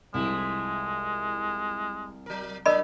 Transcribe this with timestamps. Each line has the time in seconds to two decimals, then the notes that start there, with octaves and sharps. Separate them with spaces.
0.14 C2 F3 G#3 A3 E4
2.26 F#3 A#4
2.66 A2 F#3 D4 A#4 D#5 B5